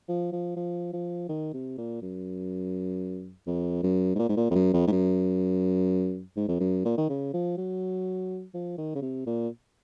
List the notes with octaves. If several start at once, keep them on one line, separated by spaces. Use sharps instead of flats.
F3
F3
F3
F3
D#3
C3
A#2
F#2
F2
F#2
G#2
A#2
G#2
A#2
F2
F#2
F2
G#2
F#2
G#2
F2
F#2
A#2
D#3
C#3
F3
F#3
F3
D#3
C#3
C3
A#2